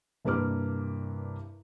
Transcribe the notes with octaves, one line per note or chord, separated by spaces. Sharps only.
C2 G2 A#3 B4 D6 F6